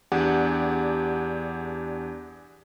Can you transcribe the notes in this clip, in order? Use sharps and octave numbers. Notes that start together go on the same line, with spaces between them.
E2 D4 G4 G#4 D5 F#5